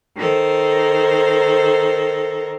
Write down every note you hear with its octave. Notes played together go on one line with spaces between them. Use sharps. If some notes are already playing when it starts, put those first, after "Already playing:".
D#3 A4 A#4 C5